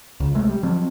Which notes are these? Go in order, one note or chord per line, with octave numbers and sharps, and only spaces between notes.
C#2
C2 G#3 A3
G3
F3 F#3 C4